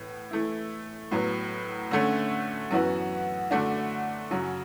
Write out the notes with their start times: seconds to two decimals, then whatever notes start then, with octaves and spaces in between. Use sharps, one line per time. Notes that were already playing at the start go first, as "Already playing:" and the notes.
Already playing: A2 E3 B3
0.31 E3 A3 E4
1.11 A2 F#3 B3
1.91 D3 A3 C#4
2.71 F#2 E3 B3 F#4
3.51 D3 A3 D4 F#4
4.31 F#2 C#3 F#3